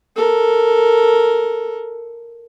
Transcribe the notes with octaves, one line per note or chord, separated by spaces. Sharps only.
A4 A#4